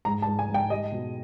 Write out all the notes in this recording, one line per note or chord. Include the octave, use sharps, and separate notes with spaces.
G#2 A#5
A5
G#2
G#5
G#2 G5
G3 D#5
B2